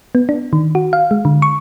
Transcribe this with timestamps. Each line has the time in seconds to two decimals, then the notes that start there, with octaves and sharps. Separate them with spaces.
0.15 B3
0.29 D4
0.53 D#3
0.75 F#4
0.93 F5
1.11 G#3
1.25 D3
1.42 C#6